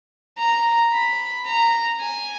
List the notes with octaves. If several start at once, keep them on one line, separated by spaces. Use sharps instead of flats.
A#5
B5
A#5
G#5